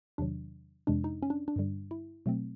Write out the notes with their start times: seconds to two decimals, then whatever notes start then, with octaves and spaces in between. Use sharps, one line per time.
0.18 E2 C3 D#3 F#3 D4
0.87 F2 C3 E3 G#3 D4
1.04 D#4
1.23 C#4
1.30 D4
1.48 D4
1.56 G2 D3 G3
1.91 E4
2.26 B2 F#3 A3 C4